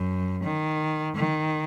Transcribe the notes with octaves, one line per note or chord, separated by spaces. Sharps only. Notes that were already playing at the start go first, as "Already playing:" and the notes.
Already playing: F#2
D#3
D#3